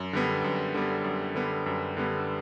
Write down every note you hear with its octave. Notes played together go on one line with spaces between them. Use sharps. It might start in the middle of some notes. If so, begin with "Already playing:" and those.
Already playing: F#2
D3 G3 B3
F#2
D3 G3 B3
F#2
D3 G3 B3
F#2
D3 G3 B3